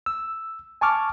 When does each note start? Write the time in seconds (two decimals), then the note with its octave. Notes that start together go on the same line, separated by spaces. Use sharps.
0.06 E6
0.81 G#5 A5 C#6 D6 F6